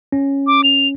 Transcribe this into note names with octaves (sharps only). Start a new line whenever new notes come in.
C#4
D6
F7